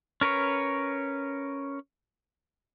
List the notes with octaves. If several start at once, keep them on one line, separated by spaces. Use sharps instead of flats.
C#4 A#4 B4 C#5